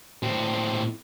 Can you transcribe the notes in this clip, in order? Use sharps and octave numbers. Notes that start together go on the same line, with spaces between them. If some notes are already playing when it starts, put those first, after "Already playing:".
A2 C4